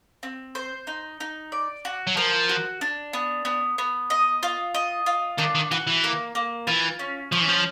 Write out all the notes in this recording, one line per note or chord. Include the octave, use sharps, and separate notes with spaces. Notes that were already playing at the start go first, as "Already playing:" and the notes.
C4
C5
D#4
D#4
D5
F#4
F#3
F3 A#4
F#4
D4
B3
B3
B3
D#5
F4
D#5
F4
D#3 D4
D#3
E3 F#4
E3
A#3
A#3
E3 F4
C#4
F3 C#4
E3
F3